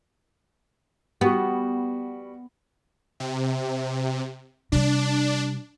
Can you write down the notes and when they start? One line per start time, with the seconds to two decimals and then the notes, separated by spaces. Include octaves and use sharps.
1.21 G3 B3 F#4
3.20 C3
4.72 C3 G3 D4